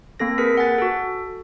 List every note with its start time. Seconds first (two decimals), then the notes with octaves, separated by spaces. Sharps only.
0.20 A#3 C4 A4 A#6
0.38 G#4 A#4 B4 B6
0.57 F#5 G#5 A6
0.78 F#4 A4